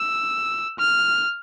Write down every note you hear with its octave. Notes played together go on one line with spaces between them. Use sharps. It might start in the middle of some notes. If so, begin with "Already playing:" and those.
Already playing: E6
F6